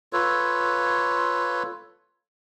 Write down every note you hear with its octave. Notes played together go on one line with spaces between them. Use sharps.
F4 A4 B4 C#5